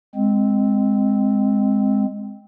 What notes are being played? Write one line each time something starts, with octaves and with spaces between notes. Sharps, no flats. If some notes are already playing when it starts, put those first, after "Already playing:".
G#3 C4